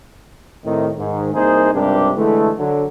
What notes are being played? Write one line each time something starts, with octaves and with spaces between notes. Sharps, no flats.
A2 C3 D#3
G#2 D#3
C2 A#3 D#4 G#4 A#4 C5
C#2 G2 C3 D4 G4 A#4
D3 E3 G#3 A3
D3 F#3